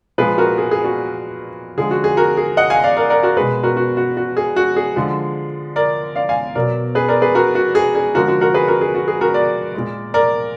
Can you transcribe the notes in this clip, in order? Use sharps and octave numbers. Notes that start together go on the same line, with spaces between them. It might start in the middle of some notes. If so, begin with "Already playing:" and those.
A#2 F3 G#3 G#4 B4
F#4 A#4
G#4
G#4
F#4
D3 F3 G#3 G#4
F#4
G#4
F#4 A#4
G#4
D#5 F#5
F5 G#5
D5 F5
A#4 D5
A#4 D5
F#4 A#4
B2 G#3 G#4 B4
F#4 A#4
F#4
F#4
F#4
G#4
F#4
G#4
D3 F3 G#3
A#4 D5
D5 F5
F5 G#5
B2 F#3 A#4 D5
G#4 B4
A#4 D5
G#4 B4
F#4 A#4
F#4
G#4
G#4
D3 F3 G#3 F#4 A#4
F#4
F#4 A#4
G#4 B4
F#4 A#4
G#4
F#4
G#4
F#4 A#4
A#4 D5
A#2 G#3
A#4 D5